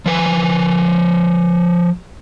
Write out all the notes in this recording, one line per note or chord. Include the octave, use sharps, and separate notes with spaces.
F3 B4 G#5